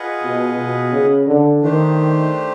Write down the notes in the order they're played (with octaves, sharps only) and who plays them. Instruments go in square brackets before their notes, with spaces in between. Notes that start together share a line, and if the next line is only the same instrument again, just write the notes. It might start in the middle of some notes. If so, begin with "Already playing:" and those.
Already playing: [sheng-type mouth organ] F4 G#4 B4 D#5 F#5
[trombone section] B2
B2
C#3
D3
[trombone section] D#3 [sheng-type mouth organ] A3 D4 G4 C5